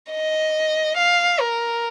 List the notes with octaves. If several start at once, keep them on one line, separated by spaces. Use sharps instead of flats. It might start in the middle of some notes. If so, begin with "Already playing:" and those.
D#5
F5
A#4